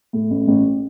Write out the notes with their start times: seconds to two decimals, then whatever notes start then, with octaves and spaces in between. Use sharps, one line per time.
0.13 A2
0.30 A1
0.48 A1